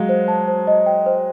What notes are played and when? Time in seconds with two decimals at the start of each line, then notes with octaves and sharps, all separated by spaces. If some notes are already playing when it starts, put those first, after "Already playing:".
Already playing: F#3 G#3 F5
0.09 C5
0.28 A5
0.48 C5
0.67 D#5
0.86 G5
1.06 C5